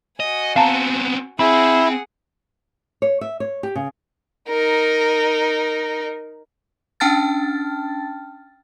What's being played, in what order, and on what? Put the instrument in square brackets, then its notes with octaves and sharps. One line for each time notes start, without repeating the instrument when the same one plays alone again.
[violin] F#4 G#5 [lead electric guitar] D#5
[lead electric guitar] B3 C4 [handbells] F5 A5 A#5
[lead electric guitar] C4 [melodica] E4 [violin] G#4 F#5 [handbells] B5
[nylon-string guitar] C#5
E5
C#5
G4
C#3
[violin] D#4 A#4
[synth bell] C#4 D4 G5 A5 F6 A6